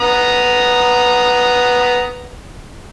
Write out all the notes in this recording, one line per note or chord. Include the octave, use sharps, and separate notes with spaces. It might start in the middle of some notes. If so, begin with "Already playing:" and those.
B3 A#5 D#6